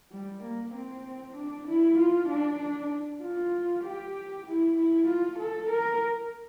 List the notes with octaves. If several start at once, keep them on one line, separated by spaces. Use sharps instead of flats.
G3
A#3
C4
D4
E4
F4
D4
D4
F4
G4
E4
E4
F4
A4
A#4